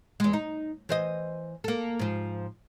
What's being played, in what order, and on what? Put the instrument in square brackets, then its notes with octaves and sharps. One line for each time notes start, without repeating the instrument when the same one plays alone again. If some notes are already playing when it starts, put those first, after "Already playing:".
[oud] E2 G#3
D#4
E3 C5 D#5
A#3 A4
G#2 F3